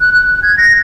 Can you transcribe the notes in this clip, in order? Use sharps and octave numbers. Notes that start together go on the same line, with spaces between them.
F#6
F#6
F#6
G#6
A#6